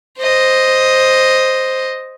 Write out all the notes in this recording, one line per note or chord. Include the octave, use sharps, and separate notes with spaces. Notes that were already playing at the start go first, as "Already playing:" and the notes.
C5 D#5